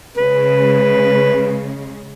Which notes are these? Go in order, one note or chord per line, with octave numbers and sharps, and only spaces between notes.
C#3 G#3 B4